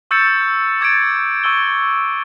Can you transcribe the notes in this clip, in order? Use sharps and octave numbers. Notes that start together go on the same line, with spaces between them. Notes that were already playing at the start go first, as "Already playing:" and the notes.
C#6 E6 G6 A6 C#7 E7
D6 G#6 A6 D7
C#6 E6 G7